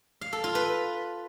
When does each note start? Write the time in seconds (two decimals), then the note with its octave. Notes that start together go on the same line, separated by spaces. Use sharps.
0.21 F5
0.33 A4
0.44 F4
0.55 B4